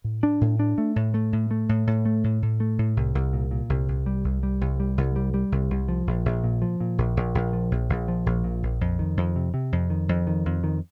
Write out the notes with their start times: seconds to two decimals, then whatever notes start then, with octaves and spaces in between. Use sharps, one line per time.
0.04 A2
0.23 D4
0.41 A2
0.59 D4
0.78 A3
0.96 A2
1.14 A3
1.33 A2
1.51 A3
1.69 A2
1.87 A2
2.05 A3
2.24 A2
2.42 A2
2.60 A3
2.79 A2
2.97 C2
3.15 C2
3.33 A#2
3.51 A#2
3.69 C2
3.88 C2
4.06 G3
4.24 C2
4.43 G3
4.61 C2
4.80 G3
4.98 C2
5.16 G3
5.34 G3
5.52 C2
5.71 C2
5.88 F3
6.07 A#1
6.25 A#1
6.44 A#2
6.62 F3
6.80 A#2
6.98 A#1
7.17 A#1
7.35 A#1
7.53 F3
7.71 A#1
7.89 A#1
8.08 F3
8.26 A#1
8.44 A#2
8.63 A#1
8.81 F2
8.99 D#3
9.17 F2
9.36 C3
9.54 C3
9.72 F2
9.90 D#3
10.09 F2
10.27 D#3
10.46 F2
10.64 D#3